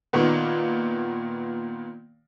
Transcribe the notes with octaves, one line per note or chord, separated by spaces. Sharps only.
A#2 D#3 A#3 B3